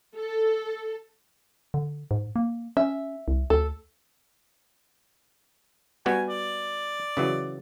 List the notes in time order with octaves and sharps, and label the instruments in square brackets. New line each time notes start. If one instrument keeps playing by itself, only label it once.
[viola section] A4
[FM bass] D3
G#2
A#3
[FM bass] C#4 [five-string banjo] E5
[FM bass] C2
[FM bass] D2 [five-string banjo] A4
[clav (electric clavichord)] G3 B3 F#4 [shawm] G#5
[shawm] D5
[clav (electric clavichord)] C#3 E3 F#3